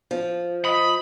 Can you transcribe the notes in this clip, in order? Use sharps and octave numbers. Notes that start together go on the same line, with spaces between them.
F3
D#5 B5